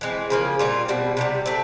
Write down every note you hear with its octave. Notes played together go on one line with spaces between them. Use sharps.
E3 G#3 C4
C#3 F3 A#3
A#2 G3 C4 F4
B2 G3 C4
C3 E3 G3
A3 C4